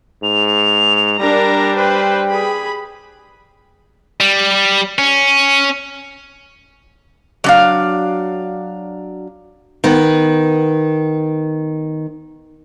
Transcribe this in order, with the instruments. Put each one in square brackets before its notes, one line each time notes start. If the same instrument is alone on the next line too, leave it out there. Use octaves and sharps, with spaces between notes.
[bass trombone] G#2 [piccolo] F7
[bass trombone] G3 [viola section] D4 A#4 A#5
[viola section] B4 C5 [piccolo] G5
[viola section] G#4 B5
[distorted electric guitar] G3
C#4
[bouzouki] F#3 D4 F5
[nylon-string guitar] D#3 B3